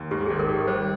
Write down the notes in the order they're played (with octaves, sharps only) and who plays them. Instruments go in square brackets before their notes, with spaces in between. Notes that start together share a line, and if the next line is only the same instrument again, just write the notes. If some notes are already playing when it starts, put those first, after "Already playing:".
Already playing: [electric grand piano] D#2
[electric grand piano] G#2 [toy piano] G4
[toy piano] G#4
[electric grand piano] G#1
[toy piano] A#4
[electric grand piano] G#1 [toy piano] G4
[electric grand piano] G3 [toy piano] C5